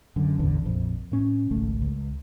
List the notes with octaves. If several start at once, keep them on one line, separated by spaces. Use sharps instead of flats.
F#2 D3
A1 E2 D3
A#1 F2
A2 C#4
G#1 C#2 A3
C#2